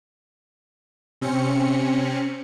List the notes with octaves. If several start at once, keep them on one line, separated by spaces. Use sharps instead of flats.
C3 C4 C#4 C#7